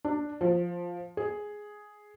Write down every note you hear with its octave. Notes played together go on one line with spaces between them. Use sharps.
D4
F3
G#4